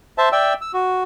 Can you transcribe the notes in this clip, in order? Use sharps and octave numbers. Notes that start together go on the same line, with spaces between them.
C5 E5 A5
D5 E5 G5 E6
E6
F#4